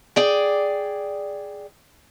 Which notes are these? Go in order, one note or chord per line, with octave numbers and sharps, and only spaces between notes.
G#4 D5 G5